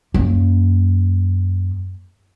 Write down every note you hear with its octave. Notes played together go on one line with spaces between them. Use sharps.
F#2 A#3